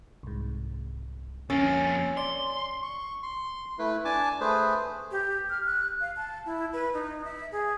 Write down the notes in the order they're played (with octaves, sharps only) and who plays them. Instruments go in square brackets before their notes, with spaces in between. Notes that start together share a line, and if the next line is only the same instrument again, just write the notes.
[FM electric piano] C2 G#2
[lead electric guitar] F2 A#3 [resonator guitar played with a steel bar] C#4 [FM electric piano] E6 A6
[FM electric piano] D5 [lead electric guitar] C6
[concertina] C#6
C6
A3 E4 B4
D4 G#5 A5 D6
A3 G#4 B4 C5
[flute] G4
F6
F#6
F5
A5
E4
B4
D#4
E5
G#4